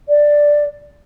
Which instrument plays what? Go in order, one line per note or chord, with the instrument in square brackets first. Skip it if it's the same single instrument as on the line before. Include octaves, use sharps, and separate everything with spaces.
[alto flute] D5